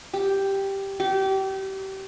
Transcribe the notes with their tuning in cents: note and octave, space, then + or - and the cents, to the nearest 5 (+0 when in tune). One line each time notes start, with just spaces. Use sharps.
G4 +0
G4 -30